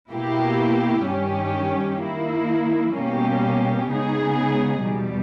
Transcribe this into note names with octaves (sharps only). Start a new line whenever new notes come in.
B2 A#3 E4 G4
G2 D#3 G3 C#4 G4
D#3 A#3 E4
B2 G3 A#3 C#4 G4
C#3 G#3 B3 D#4 G#4
E2 B2 G3